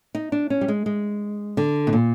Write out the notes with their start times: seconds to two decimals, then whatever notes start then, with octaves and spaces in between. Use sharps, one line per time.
0.15 D#4
0.32 D4
0.50 C#4
0.61 G3
0.68 G#3
0.86 G#3
1.57 D3
1.87 B2
1.93 A#2